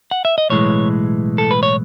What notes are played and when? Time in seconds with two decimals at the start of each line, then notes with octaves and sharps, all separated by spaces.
0.11 F#5
0.25 E5
0.38 D#5
0.50 B1 A2 E3 G#3 C#5
1.38 A4
1.51 B4
1.63 C#5